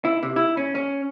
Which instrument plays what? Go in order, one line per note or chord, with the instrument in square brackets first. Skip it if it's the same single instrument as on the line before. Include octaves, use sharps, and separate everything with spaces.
[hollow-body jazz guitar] E4
C3
E4
C#4
C#4